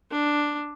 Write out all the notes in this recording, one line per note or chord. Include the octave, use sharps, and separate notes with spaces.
D4